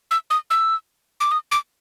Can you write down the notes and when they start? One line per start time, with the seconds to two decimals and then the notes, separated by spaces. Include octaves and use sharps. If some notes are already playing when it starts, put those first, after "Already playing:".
0.11 E6
0.30 D#6
0.50 E6
1.20 D6
1.31 D#6
1.52 D6